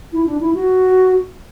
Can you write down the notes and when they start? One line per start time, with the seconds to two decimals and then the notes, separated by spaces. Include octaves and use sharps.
0.13 E4
0.26 D4
0.41 E4
0.54 F#4